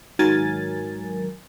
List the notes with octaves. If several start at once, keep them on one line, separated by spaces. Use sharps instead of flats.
G#2 D#3 F#3 A#4 G#5 A6